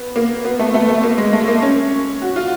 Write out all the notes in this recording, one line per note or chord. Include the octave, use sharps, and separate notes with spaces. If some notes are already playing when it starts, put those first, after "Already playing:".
Already playing: B3
A#3
B3
A3
A3
A3
A#3
G#3
A3
A#3
C#4
F#4
F4